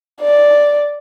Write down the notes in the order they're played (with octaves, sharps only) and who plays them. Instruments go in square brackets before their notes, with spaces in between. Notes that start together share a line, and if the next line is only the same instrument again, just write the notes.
[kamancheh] D5